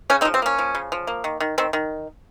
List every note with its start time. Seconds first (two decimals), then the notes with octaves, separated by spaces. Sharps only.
0.10 C#3 C#4
0.21 C4 D#4
0.25 F3
0.34 C4
0.42 A#3 C#4
0.58 F3
0.75 C#3
0.92 F3
1.07 A#3
1.24 D#3
1.40 D#3
1.58 D#3 C4
1.73 D#3